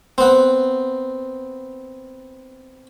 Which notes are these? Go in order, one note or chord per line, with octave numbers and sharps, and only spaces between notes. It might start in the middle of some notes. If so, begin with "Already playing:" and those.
B3 C4